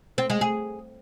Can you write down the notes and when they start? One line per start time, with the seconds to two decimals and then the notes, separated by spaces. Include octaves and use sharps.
0.18 C4
0.30 G#3
0.41 G#4